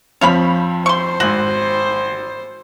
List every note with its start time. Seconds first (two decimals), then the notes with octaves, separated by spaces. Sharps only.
0.21 F2 F3 C4 C#5 F5 B5
0.86 C5 C6 C#6
1.20 G#1 F#4 F#7